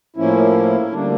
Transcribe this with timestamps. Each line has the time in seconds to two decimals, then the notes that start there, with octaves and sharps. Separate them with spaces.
0.16 A2 F3 A#3 C#4 E4
0.91 D2 D3 G3 A#3 D4